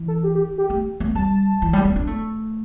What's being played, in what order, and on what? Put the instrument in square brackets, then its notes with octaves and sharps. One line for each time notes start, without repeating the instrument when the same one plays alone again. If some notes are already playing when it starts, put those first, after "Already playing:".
Already playing: [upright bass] E3
[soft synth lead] A4
G4
G4
G4
[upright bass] A3
A3
[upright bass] G3 [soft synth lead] A5
[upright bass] E3
G3
A3
D4
A3